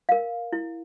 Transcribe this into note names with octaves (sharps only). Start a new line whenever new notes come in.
A#4 F5
E4